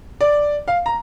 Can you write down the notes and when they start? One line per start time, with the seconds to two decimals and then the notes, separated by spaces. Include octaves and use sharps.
0.21 D5
0.68 F5
0.86 A#5